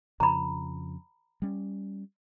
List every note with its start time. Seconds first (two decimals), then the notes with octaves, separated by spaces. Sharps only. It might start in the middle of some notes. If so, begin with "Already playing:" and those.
0.20 F2 C#3 F3 A#5 B5
1.42 G3 C#4